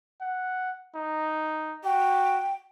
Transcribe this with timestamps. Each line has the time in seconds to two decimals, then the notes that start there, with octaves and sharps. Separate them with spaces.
0.21 F#5
0.96 D#4
1.84 F#4 G5